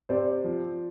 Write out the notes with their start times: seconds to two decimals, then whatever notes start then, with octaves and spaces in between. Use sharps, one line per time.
0.09 C3 C5 D5
0.44 F3